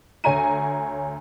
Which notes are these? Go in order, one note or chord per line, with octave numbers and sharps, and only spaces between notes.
D2 C#5 G#5 A#5 D#7